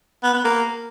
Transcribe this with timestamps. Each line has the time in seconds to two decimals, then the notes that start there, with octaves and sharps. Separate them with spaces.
0.23 B3
0.34 B3
0.45 A#3